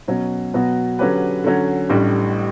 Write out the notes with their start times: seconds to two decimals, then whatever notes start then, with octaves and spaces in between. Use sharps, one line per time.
0.07 B2 F#3 C#4
0.53 B2 F#3 B3 F#4
0.99 D3 F#3 C#4 G4 B4
1.44 D3 F#3 C#4
1.89 A1 A2 G3 D4